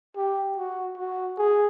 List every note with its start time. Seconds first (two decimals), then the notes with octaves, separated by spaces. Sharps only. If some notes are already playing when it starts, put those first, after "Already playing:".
0.17 G4
0.58 F#4
0.98 F#4
1.38 G#4